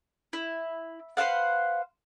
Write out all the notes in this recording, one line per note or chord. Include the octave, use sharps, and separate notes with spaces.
E4
B4 C5 F5 F#5